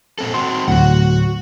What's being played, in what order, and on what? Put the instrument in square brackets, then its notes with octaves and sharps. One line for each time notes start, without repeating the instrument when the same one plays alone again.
[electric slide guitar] A#2 C4 A4
[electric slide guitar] C4 F#4 [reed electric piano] C6
[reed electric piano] D2 A2 F#3 [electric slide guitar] F#4 F#5